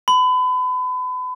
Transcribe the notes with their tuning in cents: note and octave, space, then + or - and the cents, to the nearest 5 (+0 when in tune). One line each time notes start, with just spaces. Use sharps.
B5 +35